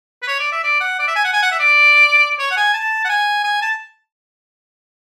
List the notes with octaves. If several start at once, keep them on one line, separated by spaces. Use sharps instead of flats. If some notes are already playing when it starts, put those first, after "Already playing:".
B4
C#5
D5
E5
D5
F#5
D5
E5
G#5
F#5
G#5
F#5
E5
D5
C#5
F#5
G#5
A5
F#5
G#5
G#5
A5